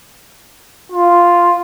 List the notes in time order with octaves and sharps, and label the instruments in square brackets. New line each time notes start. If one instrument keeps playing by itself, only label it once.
[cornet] F4